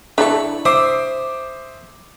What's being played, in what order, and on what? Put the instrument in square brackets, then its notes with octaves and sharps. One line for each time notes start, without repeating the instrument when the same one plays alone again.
[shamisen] D4 E4 A4 [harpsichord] B5 C#6
[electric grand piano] C5 D6 [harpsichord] E5 C6 D#6